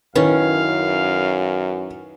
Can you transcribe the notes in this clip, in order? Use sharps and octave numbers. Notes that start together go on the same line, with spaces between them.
F#2 D#3 C#4 E4 B4 F5